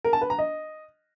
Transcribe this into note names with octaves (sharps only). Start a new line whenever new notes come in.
A#4
A5
B4
A#5
D#5